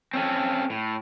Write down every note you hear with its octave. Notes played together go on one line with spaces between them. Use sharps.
C4 C#4 A4
A2